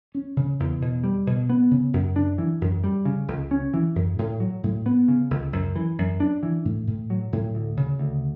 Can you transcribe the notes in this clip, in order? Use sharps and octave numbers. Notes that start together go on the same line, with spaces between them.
C#4
C#3
E2
B2
G3
B2
B3
C#3
F#2
D4
E3
F#2
G3
C#3
C#2
C#4
E3
F#2
A2
F#3
A2
B3
C#3
C#2
F#2
E3
F#2
D4
E3
A2
A2
F#3
A2
D2
C#3
D2